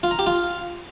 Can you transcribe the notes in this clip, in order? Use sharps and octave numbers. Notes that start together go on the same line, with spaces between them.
F4
A#5
G4
F4